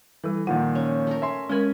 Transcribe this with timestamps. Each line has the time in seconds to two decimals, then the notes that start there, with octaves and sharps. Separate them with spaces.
0.24 E3 G3 A4
0.47 A#2 D#3 F3 F#5
0.75 C#4
1.07 A3 A#4
1.22 E5 G#5 C6
1.49 G#3 C#4 A#4 D#5 G#5 B5